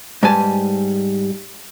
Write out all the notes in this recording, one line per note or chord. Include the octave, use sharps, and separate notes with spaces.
G#2 G3 G#3 B4 G#5 A5